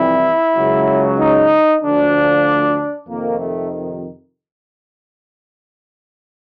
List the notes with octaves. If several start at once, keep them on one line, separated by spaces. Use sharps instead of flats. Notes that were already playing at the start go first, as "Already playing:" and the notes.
Already playing: F2 C3 E3 G3 E4
C#2 C#3 F#3
D#4
D2 D3 F3 D4
F2 C3 D#3 A#3
A3